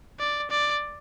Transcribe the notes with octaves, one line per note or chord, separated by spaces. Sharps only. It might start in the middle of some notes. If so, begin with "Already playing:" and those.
D5
D5